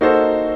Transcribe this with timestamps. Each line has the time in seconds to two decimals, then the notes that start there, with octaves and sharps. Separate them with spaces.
0.01 A#3 D#4 F#4 A4 C5